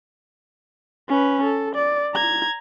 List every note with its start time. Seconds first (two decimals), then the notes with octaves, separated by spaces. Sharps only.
1.09 C#4 B4
1.44 A4
1.75 D5
2.15 A#5 G#6